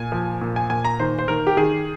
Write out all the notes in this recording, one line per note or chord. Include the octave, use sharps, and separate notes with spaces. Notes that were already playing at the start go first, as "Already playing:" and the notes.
Already playing: A#2 G#5
F3
A#2
G#5
A#2 G#5
A#5
D#3 C5
C5
D#3 A#4
G4
D#3 G#4